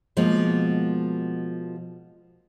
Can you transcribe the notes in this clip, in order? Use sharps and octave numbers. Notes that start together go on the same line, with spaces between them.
B2 F3 G#3 A#3